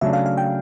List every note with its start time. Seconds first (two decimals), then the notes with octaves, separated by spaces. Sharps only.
0.01 C#3 F#3 A3 D4 E5
0.13 F5
0.26 F5
0.37 G5